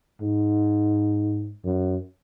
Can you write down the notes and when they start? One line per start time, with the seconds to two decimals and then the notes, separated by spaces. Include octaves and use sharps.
0.21 G#2
1.64 F#2